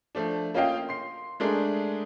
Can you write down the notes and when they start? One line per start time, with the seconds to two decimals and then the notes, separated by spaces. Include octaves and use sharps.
0.15 F3 A3 D4
0.54 A#3 C#4 F4 D#5 F5 G5
0.89 C6 C7
1.40 G#3 A3 D4 G#4 A#4